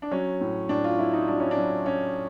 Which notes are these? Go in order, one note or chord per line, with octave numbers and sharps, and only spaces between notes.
D4
F#3 C#4
A2
A2 D4
F4
F#3 E4
D#4
F#3 D4
C#4
D4
F#3
F#3 C#4